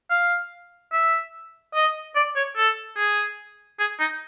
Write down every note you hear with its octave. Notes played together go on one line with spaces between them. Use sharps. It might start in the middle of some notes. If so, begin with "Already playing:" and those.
F5
E5
D#5
D5
C#5
A4
G#4
G#4
D#4